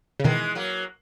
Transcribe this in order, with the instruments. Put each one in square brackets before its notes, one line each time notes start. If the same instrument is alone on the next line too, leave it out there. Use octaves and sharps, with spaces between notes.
[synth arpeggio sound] C#3
[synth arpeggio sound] B2 D#3 [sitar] E3 G#3
[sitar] F#3 A#3